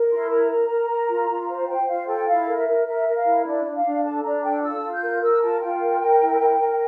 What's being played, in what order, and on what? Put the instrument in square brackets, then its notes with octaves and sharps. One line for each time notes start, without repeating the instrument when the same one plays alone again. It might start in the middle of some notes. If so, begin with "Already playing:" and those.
Already playing: [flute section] A#4
E4 C6
A#4 A#5
A#4
A#4
A#4
F4
F4
C5
C5 G5
F4 F5
A4 G5
E4 F5
A#4
E5
A#4
A#4 E5
A#4
F5
E4
D4 D5
D4
F5
D4
A4 A5
D4 A#5
A4 G5
F4 E6
F4
G6
A#4
A#4 E6
F4 A5
F4 G5
A#4
A#4
E4
A#4
A#4